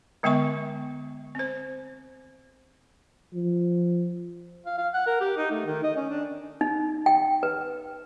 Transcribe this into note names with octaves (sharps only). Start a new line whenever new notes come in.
D3 G#3 B3 E5 G#5 C#6
C4 C5
F3
F5
F5
F#5
A#4
G4
D#4
A3
D#3
D#5
C#4
D4
D#4
G5
B4